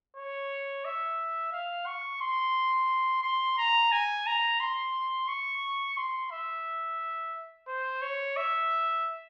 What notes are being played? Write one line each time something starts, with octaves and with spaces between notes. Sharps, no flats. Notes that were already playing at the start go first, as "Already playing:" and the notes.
C#5
E5
F5
C#6
C6
C6
A#5
G#5
A#5
C6
C#6
C6
E5
C5
C#5
E5